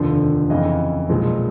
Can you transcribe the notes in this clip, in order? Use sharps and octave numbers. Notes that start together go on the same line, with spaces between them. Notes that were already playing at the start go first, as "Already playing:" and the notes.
Already playing: F1 D#2 D3 F3
F2 C#3 E3 D#5 F5
B1 A#2 F3 G#3